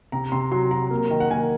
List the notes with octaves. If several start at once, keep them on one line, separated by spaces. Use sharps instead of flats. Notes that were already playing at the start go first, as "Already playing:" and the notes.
C3 A#5
C3 C6
F#3 C6
F#3 A#5
A#3
D#3
F#5
A#3 G#5